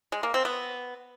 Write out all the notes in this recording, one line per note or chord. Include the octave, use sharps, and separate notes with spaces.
G#3
A#3
C4
B3